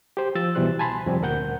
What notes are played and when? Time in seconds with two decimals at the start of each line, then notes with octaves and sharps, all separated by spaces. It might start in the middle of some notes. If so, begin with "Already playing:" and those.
0.17 G4 C5
0.35 F3 E6 A6
0.55 C2 B2 E3 G3 C5 F#6
0.79 G#5 A5 B5 C6
1.06 F2 C3 F3 G3 C4
1.21 D2 A#2 A#4 F#5 G6